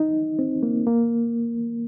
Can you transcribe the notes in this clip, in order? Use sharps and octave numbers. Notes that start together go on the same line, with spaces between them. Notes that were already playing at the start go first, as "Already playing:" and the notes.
Already playing: D#4
C4
A#3
A#3